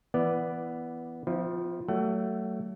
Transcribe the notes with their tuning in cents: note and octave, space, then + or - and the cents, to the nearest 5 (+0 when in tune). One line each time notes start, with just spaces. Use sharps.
E3 +15 B3 +0 D5 +0
F3 +0 C4 -45 E4 -35
F#3 +35 A3 +20 F#5 +35